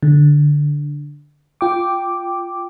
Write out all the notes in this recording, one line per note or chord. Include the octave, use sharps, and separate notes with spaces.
D3
F4 G5 D6